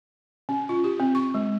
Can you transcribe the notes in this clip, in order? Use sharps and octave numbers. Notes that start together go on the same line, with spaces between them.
C#4
F4
G4
C4
C#6
G#3